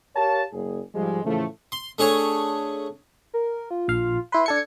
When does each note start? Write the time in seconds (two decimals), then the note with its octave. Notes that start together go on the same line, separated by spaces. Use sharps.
0.16 G4 A#4 C#5 F5 A5
0.53 F#1 G#4
0.94 G#2 F3 G3 G#3
1.25 A2 C#3 E3 F3 A3
1.72 C6
1.98 A3 D4 G#4 C#5
3.34 A#4
3.71 F4
3.88 A#1 F5
4.32 E4 B4 C6
4.46 D4 A4 G#6 C#7